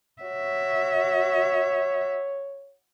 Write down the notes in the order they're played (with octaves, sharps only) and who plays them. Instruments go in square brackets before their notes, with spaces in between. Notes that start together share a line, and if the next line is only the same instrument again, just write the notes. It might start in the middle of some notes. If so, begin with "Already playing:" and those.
[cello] F#4 E5 [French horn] C#5